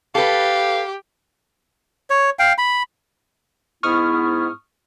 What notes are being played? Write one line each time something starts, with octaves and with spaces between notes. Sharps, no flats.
G4 A4 B4 F5
C#5
F5 G5
B5
G#2 B3 E4 C#6 D#6 F6